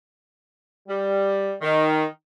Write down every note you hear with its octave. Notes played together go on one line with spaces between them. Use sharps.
G3
D#3